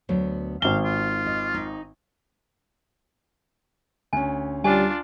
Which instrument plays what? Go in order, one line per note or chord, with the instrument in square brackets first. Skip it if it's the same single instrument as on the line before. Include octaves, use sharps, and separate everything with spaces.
[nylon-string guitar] D2 F#3 B3
[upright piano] G#1 G7 [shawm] F5 [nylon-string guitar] A5
[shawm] F4
[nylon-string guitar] D#5
D#4
[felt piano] D2 C#4 [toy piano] G#5
[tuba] G3 [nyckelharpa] D4 F4 [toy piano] G#5